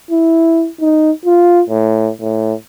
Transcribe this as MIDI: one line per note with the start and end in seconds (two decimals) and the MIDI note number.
0.11 0.68 64
0.81 1.11 63
1.25 1.62 65
1.70 2.10 45
2.20 2.54 45